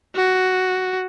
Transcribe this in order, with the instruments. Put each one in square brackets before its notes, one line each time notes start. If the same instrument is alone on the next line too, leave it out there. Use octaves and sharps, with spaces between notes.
[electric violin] F#4